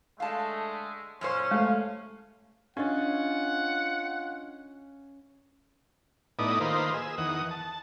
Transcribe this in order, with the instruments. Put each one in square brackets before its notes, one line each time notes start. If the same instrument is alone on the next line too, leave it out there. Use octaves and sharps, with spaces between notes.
[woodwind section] D3 G#3 A3 [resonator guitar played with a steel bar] F5 A5
[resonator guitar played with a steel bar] F#2 A#2 C5 [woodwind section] C#4
[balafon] G#3 [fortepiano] A3 F5
[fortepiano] C#4 [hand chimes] D4 D#5 A6 [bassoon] F4 [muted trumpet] F#5
[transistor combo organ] A2 B3 D#4 E4 D5 D#6
D#3 A#3 F4 B4 C5 D#5
G#4 E6
E2 D#3 F#5 D#6
A5